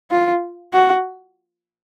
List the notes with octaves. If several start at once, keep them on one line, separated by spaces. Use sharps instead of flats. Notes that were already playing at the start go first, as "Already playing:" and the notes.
F4
F#4